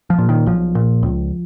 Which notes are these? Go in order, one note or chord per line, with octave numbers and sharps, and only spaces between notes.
F3
A#2
D#3
B1 F3
A#2
C#2